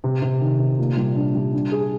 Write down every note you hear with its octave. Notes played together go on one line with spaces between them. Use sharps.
C3
C3
D#3
C3
A#2
G3
D4
G3
D4
G#4